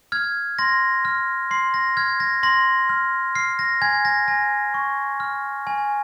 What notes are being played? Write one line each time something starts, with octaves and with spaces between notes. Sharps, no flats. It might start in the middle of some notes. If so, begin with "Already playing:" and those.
F6 G#6
C6 A#6
F6
C6 C7
A#6
F6 G#6
A#6
C6 A#6
F6
F6 C7
A#6
G#5 G#6
A#6
G#5 A#6
C#6
F6
G#5